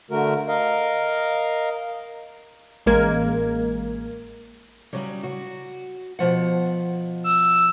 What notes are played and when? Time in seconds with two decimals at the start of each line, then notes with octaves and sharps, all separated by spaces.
0.11 D3 A3 F#4 A#4
0.48 A#4 D#5 F5
2.86 A1 G#3 A#3 A#4 G#6
4.93 C#3 F#3 G3
5.23 F#4
6.19 B2 F3 F#5
7.24 E6